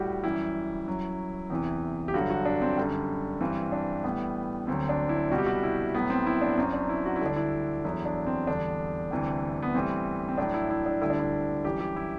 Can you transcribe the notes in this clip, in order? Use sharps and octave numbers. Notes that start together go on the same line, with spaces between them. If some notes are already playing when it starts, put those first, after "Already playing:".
Already playing: A2 G3 F#4 G4
F#2 E3 G3 E4
F#2 F#3
E2 C3 E3
G4
G2 D3 F#3 F#4
F#4
D4
C4
F#2 D3 G3
G2 E3 G3 C4
D4
A2 E3 G3 B3
D2 D3 F#3 C4
D4
E4
C2 B2 G3 F#4
G4
F#4
E4
A2 F#3 B3
C4
E4
D4
F#2 F#3 C4
D4
E4
F#4
E4
D2 D3 G3 D4
E4
E2 D3 F#3 E4
D4
C4
E2 D3 G3 D4
D2 C3 E3 G3
B3
A2 E3 G3 C4
C4
A2 F#3 D4
E4
E4
D4
D2 D3 G3 E4
D4
E4
F#2 E3 G3 G4
G4
E4